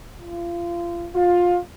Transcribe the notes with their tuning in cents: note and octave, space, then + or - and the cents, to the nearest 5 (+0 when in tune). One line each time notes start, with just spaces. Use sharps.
F4 -30
F4 +20